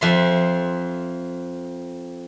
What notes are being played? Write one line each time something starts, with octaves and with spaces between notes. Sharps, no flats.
F2 E5 C6